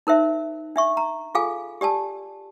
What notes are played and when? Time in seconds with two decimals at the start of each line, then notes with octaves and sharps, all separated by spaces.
0.07 D#4 A#4 C5 E5
0.76 D4 E5 C#6
0.97 A#5
1.35 F4 G#4 A4 F5 G#5
1.81 G4 D5 G#5 A5